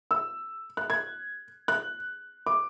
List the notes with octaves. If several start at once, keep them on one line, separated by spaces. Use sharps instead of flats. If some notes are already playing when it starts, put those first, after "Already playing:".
E6
F#6
G#6
F#6
D6